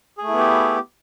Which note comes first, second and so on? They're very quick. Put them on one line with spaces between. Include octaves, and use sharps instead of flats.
G#4 A3 E4 B3 G4